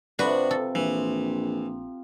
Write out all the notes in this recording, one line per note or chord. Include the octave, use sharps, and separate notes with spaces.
C3 F3 C4 D4 F#4 B4 C#6
A4
A#1 E3